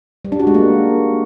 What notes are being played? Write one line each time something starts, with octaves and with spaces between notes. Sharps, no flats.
G3
D4
F#4
G#3
A#3